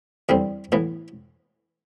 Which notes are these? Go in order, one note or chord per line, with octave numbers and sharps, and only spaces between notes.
E2 D3 G3 C4
A2 E3 B3